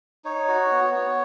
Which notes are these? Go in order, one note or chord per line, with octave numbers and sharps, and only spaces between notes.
D#4 C#5
F#4
B3
B3